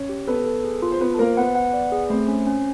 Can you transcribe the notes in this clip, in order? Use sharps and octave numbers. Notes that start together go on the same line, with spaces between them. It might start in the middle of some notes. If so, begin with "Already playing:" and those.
Already playing: C#4 C#5
G4
B3 A4 B4
A4
G#4
F4
C5
B3 F4 B4
A4
A#3 A#4 C5
B3 B4 F#5
F#5
D5
G#4
A3 C4 C5
C#4
C#4